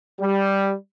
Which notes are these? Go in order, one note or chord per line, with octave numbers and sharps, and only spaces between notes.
G3